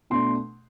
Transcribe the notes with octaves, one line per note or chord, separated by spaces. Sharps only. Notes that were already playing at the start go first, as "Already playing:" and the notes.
B2 A3 D4 C6